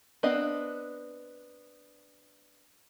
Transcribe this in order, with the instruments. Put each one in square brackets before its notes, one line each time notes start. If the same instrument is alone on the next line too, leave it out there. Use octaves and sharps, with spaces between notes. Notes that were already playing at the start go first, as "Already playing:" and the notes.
[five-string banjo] B3 C4 D4 D#5 F5